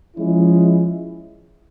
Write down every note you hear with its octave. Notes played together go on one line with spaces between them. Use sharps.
F3 G#3 C#4 E4